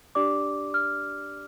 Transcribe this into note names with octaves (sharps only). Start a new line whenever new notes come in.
D4 G4 D5 D6
F6